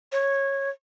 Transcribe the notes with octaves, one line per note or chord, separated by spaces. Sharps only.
C#5